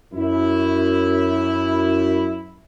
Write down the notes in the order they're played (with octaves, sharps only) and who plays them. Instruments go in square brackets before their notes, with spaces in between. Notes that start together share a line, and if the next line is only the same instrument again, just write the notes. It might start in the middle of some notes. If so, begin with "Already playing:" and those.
[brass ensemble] F#2 E4